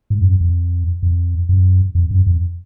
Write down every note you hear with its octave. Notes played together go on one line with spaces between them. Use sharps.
G#2
F2
F#2
F2
F2
F#2
F2
F#2
F2